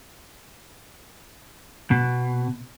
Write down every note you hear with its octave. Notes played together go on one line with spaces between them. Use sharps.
B2